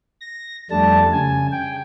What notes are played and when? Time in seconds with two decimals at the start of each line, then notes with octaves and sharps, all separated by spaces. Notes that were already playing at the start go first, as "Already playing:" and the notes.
0.21 A#6
0.71 F2 G3 A3 D4 A5
1.13 C#3 G#5
1.52 G5